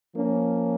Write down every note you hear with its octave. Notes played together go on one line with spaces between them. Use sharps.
F3 A#3 C#4